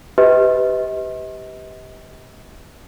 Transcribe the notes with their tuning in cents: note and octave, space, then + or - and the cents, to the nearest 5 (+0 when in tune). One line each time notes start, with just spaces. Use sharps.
G4 +0 B4 +20 D#5 +40